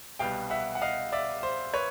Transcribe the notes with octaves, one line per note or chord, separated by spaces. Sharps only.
C2 B2 G3 F5 G5
E5 F#5
F#5
D#5 F5
D5 E5
C5
B4 C#5